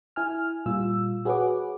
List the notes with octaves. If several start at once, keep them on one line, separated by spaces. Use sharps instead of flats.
E4 G#5 F6
A#2 G3 F4 E6
F#4 G#4 B4 C#5 F#5 D6